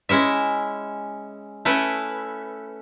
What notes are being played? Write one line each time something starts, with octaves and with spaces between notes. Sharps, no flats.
G#3 C#4 E4 E5
A3 C#4 E4 B4